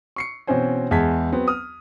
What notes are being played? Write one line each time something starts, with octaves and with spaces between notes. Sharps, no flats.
C#6 C7 C#7
B2 E3 C4 C#4 C5 G#5
E2 G#3 A5 G#6 B6
F#3 B3 C4
D#6 F6